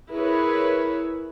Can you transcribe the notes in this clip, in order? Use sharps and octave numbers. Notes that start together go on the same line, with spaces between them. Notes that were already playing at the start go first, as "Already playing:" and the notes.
E4 G#4 A#4 B4 C#5